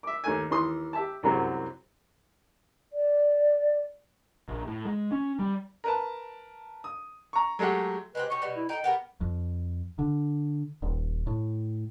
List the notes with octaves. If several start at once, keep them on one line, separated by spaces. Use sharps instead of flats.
E5 D6
D#2 A3 G#5
D#2 E3 C6 D#6
G4 E5 A5
C2 F#2 C3 F#3 G#3 C4
D5
A#1
A2
G#3
C#4
G3
A#4 B4 A5
D#6
A#5 C#6
F#3 G#3 A3 G4 F#5
G#3 C4 G4 B4
C#4 D#4 G4 C#6
B2 G3
E4
D#4 G4 A4 G5
B3 G4 A#4
F2
D3
D#1
A2